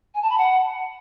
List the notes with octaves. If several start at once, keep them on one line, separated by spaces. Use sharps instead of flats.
G#5
A5
B5
F#5